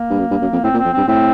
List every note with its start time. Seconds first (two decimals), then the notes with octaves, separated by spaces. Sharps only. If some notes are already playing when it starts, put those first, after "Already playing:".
Already playing: A#3
0.10 G2
0.19 F#2
0.31 G2
0.42 F#2
0.53 F2
0.63 A2 C4
0.74 A#2
0.79 C4
0.85 F2
0.93 G2 C4
1.08 A2 C4